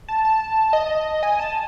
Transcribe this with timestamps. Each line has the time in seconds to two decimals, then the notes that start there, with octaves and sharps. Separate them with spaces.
0.08 A5
0.25 A5
0.73 D#5
1.23 G#5
1.40 A5